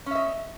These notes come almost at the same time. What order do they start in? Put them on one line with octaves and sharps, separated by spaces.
C#4 E5 D#5